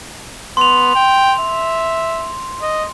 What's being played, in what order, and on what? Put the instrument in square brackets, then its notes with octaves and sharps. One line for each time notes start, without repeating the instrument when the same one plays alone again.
[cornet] B3 [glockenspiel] C6 F7
[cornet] G5
E5
D#5